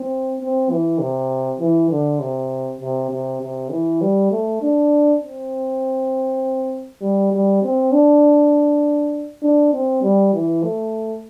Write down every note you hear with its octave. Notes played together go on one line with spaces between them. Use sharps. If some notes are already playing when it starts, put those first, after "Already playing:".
Already playing: C4
C4
E3
C3
E3
D3
C3
C3
C3
C3
E3
G3
A3
D4
C4
G3
G3
C4
D4
D4
C4
G3
E3
A3